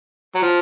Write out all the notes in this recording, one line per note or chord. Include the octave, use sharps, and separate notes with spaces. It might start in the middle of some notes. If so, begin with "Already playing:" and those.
F#3
F3